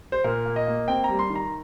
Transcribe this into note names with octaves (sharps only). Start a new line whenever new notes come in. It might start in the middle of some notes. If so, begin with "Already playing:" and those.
C5
A#2 A#4
A#3
D#5
A#3
C4 G5
G3 A#5
C6
D#3
A#5